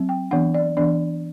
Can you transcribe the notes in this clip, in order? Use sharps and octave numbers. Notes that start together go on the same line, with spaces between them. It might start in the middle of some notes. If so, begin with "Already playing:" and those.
Already playing: F#3 C4
G5
E3 B3 D4 F#5
D5
E3 B3 D4 D5